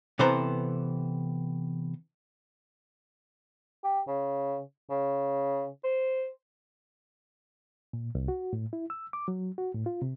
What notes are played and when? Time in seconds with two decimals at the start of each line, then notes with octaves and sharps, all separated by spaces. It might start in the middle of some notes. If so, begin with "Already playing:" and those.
0.19 C3 E3 B3 A4 C5 A#5
3.84 G4
4.07 C#3
4.90 C#3
5.84 C5
7.93 A#2
8.15 C2
8.28 F#4
8.53 A2
8.73 E4
8.90 E6
9.13 D6
9.28 F#3
9.58 F#4
9.75 A2
9.86 F4
10.02 C3